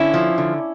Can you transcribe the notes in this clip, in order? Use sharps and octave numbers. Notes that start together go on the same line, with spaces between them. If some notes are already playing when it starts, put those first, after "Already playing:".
Already playing: D3 C#4 E4
F3
D3